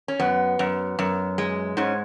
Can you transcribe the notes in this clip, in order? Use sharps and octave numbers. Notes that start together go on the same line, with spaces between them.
C#4
F#2 B3
F#2
F#2
G#3
G#2 C#4